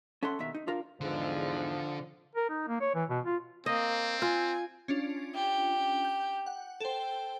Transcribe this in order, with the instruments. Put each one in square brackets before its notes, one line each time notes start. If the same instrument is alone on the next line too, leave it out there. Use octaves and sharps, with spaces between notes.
[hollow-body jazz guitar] C#4 A4 E5 F#5 C6
D#2 B2 D#3 E5
D#4
D4 F4 A#4 F5
[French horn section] E2 G#2 [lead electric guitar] D3 [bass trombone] F3
[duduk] A#4
D#4
A#3
C#5
E3
B2
F4
[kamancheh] A#3 [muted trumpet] C4 [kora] D#5
[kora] F4 [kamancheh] G#5
[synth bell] C#4 D4 F4
[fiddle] G4
[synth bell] G6
F#5
[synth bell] A4 C5 [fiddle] G5